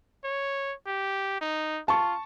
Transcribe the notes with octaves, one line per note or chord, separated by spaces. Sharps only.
C#5
G4
D#4
F4 A5 C#6